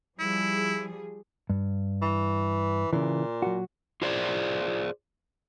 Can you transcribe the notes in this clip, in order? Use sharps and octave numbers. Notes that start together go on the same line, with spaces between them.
F3 G3 E4 G#4
G2
E3
A#2 C#3 E3
F#3 F#4
F4 G#4 C5 D5